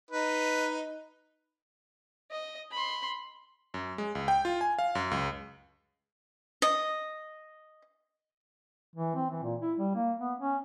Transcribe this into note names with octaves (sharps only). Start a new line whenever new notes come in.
D#4 B4
D#5
B5 C6
F#2
G#3
C#2
G5
F4
G#5
F5
F#2
C#2
D#5
E3
C4
E3
A#2
E4
G3
A#3
B3
C#4